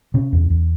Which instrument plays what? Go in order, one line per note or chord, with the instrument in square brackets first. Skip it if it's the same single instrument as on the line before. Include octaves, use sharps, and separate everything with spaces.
[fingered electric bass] C3 C#4
E2
E2